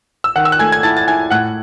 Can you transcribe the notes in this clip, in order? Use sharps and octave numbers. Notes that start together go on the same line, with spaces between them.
E6
D#3 F#5 F#6
E6
F#6
A3 G#5 G#6
G#6
E4 A5 A6
A6
E4 G#5 G#6
A2 F#5 F#6